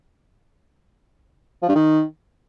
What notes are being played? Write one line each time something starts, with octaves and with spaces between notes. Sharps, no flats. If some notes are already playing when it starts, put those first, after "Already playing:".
F3
G2
D#3